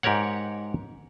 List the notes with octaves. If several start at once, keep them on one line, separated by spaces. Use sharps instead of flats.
G#2 G4 A#4 C#5 F#5